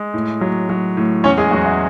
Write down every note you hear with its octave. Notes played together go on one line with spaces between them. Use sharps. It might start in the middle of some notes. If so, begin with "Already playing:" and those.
Already playing: G#3
A2
F#3
F#3
A2
E2 C#4 C#5
G#3 G#4
E2 F#3 F#4
E4